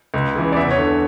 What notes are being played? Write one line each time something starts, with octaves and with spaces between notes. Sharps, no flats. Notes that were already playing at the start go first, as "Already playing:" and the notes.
C#2
C#3 E3
D5
E2 E5
C#5
D3